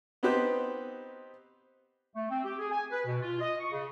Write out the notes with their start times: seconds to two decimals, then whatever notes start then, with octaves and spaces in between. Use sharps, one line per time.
0.23 B3 C4 D#4 G4 B4 C5
2.15 A3
2.30 C4
2.44 G4
2.59 G#4
2.71 G#5
2.91 B4
3.06 B2
3.22 F4
3.40 D#5
3.59 C#6
3.71 C#3